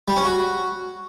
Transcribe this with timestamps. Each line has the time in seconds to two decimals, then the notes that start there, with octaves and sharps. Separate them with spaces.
0.08 G3
0.16 C#4
0.25 F#4